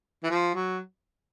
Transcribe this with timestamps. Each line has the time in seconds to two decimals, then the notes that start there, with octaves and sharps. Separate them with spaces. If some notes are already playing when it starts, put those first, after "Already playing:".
0.23 E3
0.30 F3
0.54 F#3